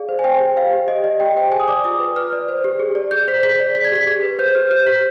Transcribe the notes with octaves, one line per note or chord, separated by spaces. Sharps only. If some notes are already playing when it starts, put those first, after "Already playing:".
Already playing: G#4 D5 F5
C5
G#5
C5 G5
G4
C5 F5
G4
G4 D#5
D5 D#5
G4 G5
C5 G5
G#4 G#5
D#6
D5 D6
F4 D#6
B4
B4 F6
D5
C5
G4
G#4
D5
G#4 G6
C5 B6
G#4 B6
D5
D5 B6
G#6
G4 B6
G#4
B4
C5 G6
G4 F6
C5 G6
G4 B6